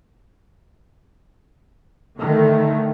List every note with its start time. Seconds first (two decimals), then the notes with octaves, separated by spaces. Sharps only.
2.17 D3 D#3 A3